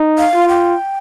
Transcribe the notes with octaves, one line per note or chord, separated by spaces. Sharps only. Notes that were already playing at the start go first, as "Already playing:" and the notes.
Already playing: D#4
F5
F4
G5